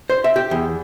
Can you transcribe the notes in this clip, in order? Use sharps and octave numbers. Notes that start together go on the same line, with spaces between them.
C5
E5
G4
E2